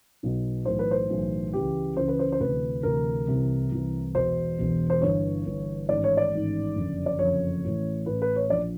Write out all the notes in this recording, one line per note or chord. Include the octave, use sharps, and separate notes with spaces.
B1 B2
B1 A2 E3 C5
B4
C5
B1 A2 E3
C#2 C#3 E3 G4
C#2 C#3 E3 C5
B4
C5
C5
D2 C3 E3 B4
D2 C3 E3 A#4
C2 C3 E3
C2 C3 E3
E1 E2 B2 C5
E1 E2 B2
C5
G1 G2 E3 C#5
G1 G2 E3
A1 G#2 D#3 D5
C#5
D5
A1 G#2 D#3
F#1 F2 D3
D5
F#1 F2 D3 C#5
A1 A2 E3
A1 A2 E3 B4
B4
C#5
A#1 A#2 D5